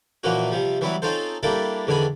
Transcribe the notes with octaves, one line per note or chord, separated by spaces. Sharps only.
A#2 E3 F3 A#3 C#4 F#4
C3 F3 G3
E3 F#3 G3 B3 E4
C4 C#4 D#4 F4 A4 C5
G3 A#3 D4 E4 G4 A4
E2 D3 D#3 D4 G#5 B5